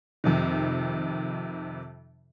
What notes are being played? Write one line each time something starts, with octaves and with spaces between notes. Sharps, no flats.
F2 C3 D#3